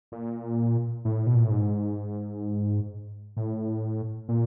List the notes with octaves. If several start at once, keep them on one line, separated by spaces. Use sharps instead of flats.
A#2
A2
B2
A#2
A2
G#2
A2
A#2